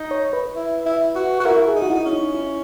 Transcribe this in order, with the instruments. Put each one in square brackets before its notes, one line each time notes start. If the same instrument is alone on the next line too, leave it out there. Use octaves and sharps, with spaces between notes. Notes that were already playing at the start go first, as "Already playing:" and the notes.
Already playing: [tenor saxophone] D#4
[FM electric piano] C#5
B4
[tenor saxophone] E4
E4
F#4
F#4
[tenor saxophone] E4 [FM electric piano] A#4
[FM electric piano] G#4
[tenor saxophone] D#4
[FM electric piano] F#4
[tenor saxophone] D#4 [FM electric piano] E4
[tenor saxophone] C#4
[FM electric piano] D#4
E4